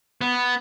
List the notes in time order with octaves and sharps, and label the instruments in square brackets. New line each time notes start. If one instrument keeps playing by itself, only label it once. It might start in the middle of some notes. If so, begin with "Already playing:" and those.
[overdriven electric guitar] B3